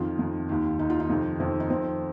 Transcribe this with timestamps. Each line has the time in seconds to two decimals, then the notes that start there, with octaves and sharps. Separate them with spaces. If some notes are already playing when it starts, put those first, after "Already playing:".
Already playing: F2 D#3 F4
0.19 F2 D#3
0.49 D#2 D#3
0.79 D#2 D#3 D#4
0.90 F4
1.00 D#4
1.09 F2 C3 D#3
1.39 F2 C3 D#3 C4
1.60 D#4
1.70 F2 D#3 C4